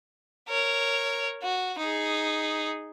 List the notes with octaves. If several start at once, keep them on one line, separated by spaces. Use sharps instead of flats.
A#4 C#5
F#4
D#4 G#4